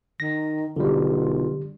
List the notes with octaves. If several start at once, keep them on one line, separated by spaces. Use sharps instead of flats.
D#3 A#6
B1 D3 G3 F4